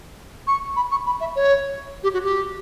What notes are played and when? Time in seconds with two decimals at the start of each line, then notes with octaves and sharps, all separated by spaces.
0.47 C#6
0.76 B5
0.91 C#6
1.06 B5
1.21 E5
1.36 C#5
2.03 G4
2.13 F#4
2.24 G4